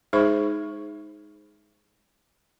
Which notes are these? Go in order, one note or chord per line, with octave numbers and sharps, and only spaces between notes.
G#3 D#4 G#4 C5 C#6